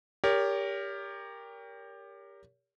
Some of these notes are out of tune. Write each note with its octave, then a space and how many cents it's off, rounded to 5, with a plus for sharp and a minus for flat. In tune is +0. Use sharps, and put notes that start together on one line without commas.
G4 +20 A#4 +0 C#5 +40